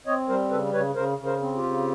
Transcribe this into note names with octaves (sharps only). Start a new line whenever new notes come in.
C4 C#5 D#5
G3 A#4 C5
C#3 A4 B4
C#3 B4 C#5
C#3 A#4 C5
C#3
A#4 C5
C4
F4 G4
C#3